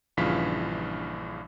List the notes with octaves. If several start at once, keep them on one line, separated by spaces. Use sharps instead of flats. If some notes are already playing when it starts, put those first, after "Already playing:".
A#1 G2 C#3 E3 F4 B6